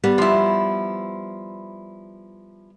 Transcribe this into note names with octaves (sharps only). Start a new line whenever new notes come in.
G3 B3
F3 E4